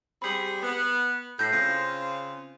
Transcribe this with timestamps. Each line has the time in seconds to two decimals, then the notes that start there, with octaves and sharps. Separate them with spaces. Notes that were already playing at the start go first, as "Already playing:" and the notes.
0.22 G3 C4 G#4 B5 F#7
0.63 B3
1.39 A2 G6 A#6 C7
1.52 C#3 C4 F4 A#6